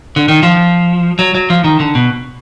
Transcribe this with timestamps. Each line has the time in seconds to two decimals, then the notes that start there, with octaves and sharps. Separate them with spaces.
0.16 D3
0.28 D#3
0.43 F3
1.19 F#3
1.35 F#3
1.50 F3
1.64 D#3
1.80 D3
1.95 B2